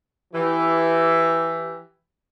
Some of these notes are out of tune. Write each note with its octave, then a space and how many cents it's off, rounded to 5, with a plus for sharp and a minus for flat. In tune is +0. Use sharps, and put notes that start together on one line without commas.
E3 +5 G4 -15